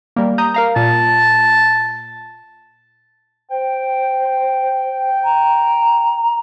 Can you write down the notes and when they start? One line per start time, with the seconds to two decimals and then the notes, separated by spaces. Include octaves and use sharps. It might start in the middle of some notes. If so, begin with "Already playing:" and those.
0.16 G3 A#3
0.38 A#5 D#6 G6
0.54 A#4 F5 A#5
0.76 A#2 A5
3.50 C5 G5
5.24 A#5